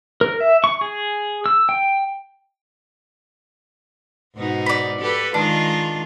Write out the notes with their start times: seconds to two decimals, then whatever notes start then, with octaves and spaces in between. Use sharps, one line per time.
0.21 A#4
0.40 E5
0.64 C#6
0.81 G#4
1.46 E6
1.69 G5
4.35 G#2 B2 D#4
4.66 D5 B5
5.00 G4 A4 B4
5.34 D#3 G#3 D4 F4